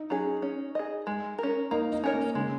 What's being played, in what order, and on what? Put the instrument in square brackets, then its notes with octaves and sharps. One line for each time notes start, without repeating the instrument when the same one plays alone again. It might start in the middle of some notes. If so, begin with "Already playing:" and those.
Already playing: [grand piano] D#4
[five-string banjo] F#3 C#4 G#4
C#4
G#4 D#5
G#3
C#4 A#4
[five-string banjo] A#3 [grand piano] D#4
[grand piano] D#4
[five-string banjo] C#4 A#4 C#5
[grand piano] A#3
[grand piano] C#3 [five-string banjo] G#3